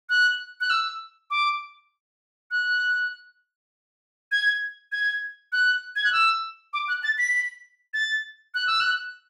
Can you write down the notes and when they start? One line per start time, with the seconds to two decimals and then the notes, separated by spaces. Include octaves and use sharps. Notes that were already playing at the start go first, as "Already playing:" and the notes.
0.09 F#6
0.61 F#6
0.70 E6
1.31 D6
2.51 F#6
4.32 G#6
4.92 G#6
5.52 F#6
5.96 G#6
6.05 F#6
6.13 E6
6.74 D6
6.88 F#6
7.03 A6
7.18 B6
7.94 A6
8.54 F#6
8.67 E6
8.80 F#6